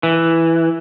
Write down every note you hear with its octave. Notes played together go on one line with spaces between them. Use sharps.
E3